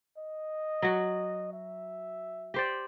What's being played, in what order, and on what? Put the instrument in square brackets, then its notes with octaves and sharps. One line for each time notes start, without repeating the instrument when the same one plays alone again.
[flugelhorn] D#5
[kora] F#3 F#4
[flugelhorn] E5
[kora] G4 C5 D5